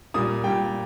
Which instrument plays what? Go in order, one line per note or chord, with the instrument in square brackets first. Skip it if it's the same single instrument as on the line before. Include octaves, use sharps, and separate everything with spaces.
[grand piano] A#2 G3 D#6
A#2 G3 G5